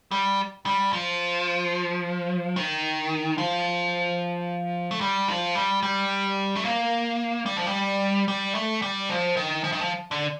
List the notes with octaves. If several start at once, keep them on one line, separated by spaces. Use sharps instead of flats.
G3
G3
F3
D#3
F3
A3
G3
F3
G3
G3
A3
A#3
G3
F3
G3
G3
A3
G3
F3
D#3
F3
D#3
F3
D3